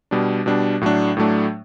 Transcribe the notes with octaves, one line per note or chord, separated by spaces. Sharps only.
B2 G3 D4
B2 G3 D4
A2 F#3 A3 D4
A2 F#3 A3 D4